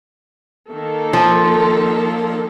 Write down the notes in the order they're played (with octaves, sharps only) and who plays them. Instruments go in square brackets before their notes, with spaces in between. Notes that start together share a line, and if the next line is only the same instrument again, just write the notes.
[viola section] D#3 A#3 A4
[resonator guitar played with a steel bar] F3